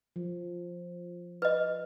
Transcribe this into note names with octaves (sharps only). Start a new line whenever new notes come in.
F3
B4 D#5